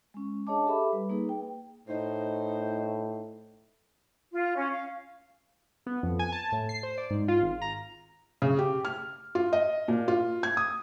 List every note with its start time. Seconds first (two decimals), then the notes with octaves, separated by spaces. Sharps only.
0.14 G#3 C#4
0.47 D4 G#4 C#5 D#5 A5 D6
0.66 G4 A4 E5 B5 D6
0.92 G3 B4
1.09 A#3 D#4 G#4 B4
1.29 G5
1.88 A2 D#4 C5
4.32 F4
4.56 C#4
4.72 F5
5.86 B3
6.03 F2
6.19 G#5
6.32 A5
6.52 A2
6.69 C7
6.83 C5
6.98 D5
7.10 G#2
7.28 F4
7.42 G#1
7.62 A#5
8.42 C#3
8.59 G4
8.85 F6
9.35 F4
9.53 D#5
9.88 A#2
10.08 F4
10.43 G#6
10.57 D#6